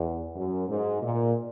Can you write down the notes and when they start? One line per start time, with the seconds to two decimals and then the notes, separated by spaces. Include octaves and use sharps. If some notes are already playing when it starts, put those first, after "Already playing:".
Already playing: E2
0.36 F#2
0.69 G#2
1.02 A#2